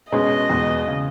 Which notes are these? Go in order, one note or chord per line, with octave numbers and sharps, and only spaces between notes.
B2 G#3 C#4 G#4 D#5
E2 B2 G#3
C#3